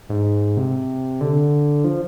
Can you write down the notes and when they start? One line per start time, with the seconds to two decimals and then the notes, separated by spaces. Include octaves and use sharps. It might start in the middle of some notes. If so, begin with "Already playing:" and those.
0.09 G#2
0.57 C3
1.21 D3
1.84 F3